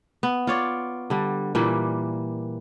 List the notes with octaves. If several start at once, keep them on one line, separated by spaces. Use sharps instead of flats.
B3
F4 C#5 D5
D3 G3
A#2 E3 G3 A#3